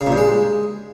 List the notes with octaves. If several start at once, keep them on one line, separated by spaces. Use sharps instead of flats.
C#3
A#2
G2
G#3